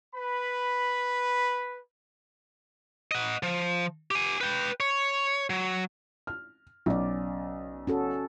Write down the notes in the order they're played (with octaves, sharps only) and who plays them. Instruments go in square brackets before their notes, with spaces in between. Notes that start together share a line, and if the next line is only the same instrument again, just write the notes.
[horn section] B4 B5
[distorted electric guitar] D#5 F#5
F3
G4 G#5
B4 G5
C#5
F#3
[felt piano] F6
[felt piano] B1 [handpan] C#4 D5
[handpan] C#4 F#4 A4